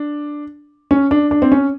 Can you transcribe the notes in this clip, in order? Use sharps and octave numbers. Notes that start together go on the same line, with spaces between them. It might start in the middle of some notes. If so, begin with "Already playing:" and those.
Already playing: D4
C#4
D4
D4
C4
C#4